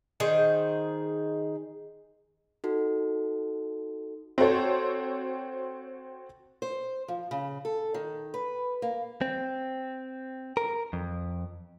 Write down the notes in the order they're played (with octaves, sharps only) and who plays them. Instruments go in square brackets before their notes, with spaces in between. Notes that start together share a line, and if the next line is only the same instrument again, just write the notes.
[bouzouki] D#3 D#4 G#4 C5
[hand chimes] D#4 F#4 A4
[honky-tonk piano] C4 F#4 A4 C5 C#5
[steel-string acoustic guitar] C5
F3
C#3
A4
D#3
B4
A#3
[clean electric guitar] C4
A#4
F2